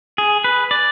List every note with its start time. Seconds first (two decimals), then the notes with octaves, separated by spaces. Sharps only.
0.18 G#4
0.44 B4
0.71 D5